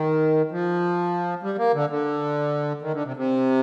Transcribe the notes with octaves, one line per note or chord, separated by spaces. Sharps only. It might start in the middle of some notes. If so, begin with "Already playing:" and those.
Already playing: D#3
F3
G3
A#3
D3
D3
D#3
D3
C3
C3